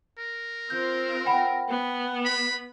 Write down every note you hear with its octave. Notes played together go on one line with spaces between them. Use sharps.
A#4
C4 F4 G6
F#5 G5 B5
B3
B5